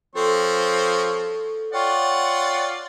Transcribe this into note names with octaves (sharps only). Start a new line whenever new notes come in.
F3 C4 A4 C#5
F4 C#5 D5 F#5 G5 C#6